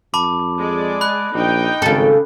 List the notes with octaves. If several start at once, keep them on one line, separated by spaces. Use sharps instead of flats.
F2 A5 B5 D6
G#3 D5
B5 F#6
A#1 D#4 G5
G#1 C#3 A4